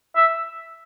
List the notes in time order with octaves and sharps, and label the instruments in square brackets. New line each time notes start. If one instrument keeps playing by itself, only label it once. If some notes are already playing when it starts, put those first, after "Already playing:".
[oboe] E5